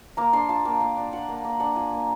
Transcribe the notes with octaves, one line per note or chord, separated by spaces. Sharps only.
A#3 A#5
D4 C6
F4 A5
A#3 G5
A#3
D4
F4 F#5
A#3
A#3
D4 F#5
F4 G#5
A#3